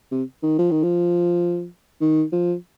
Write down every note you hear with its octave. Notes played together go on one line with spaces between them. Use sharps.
C3
D#3
F3
D#3
F3
D#3
F3